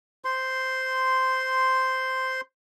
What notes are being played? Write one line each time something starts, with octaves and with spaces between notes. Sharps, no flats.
C5 C6